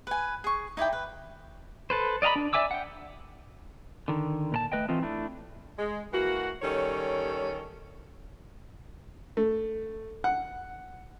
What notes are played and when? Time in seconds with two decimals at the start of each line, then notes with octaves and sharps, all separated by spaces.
0.07 B4 G#5
0.44 G#4 C#6
0.77 D#4 E4 D5 G5
0.93 B4
1.90 A4 B4 C5
2.22 D5 D#5 F5 A#5 B5
2.36 D4
2.53 D5 E5 G#5 D6 E6
2.71 F#5 G5
4.08 D3 D#3
4.52 A#2 A#4 A5
4.72 A3 B4 D#5 G5
4.88 E3 A3 C4 F4 D#5
5.02 A3 D4 E4
5.77 G#3
6.13 E3 A#3 F#4
6.62 D#3 G3 C#4 A4 C#5
9.37 A3
10.24 F#5